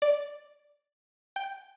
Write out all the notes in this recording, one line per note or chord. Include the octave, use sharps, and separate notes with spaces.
D5
G5